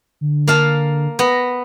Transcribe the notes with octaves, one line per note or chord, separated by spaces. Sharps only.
D3
A#3 F5 A5
B3 A#6